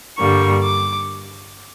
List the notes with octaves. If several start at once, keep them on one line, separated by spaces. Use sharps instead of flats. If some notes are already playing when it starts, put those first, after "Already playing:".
G2 D3 G3 A#3 C#6
D6